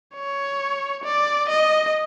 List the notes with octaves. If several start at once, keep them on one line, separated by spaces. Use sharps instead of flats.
C#5
D5
D#5